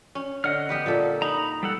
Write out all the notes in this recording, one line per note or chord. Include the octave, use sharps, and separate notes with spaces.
C#4
D3 D#5 F#5 F6
B3 G4 B4
A#2 A#3 A4
D#4 A#5 B5
G3 A4 F#5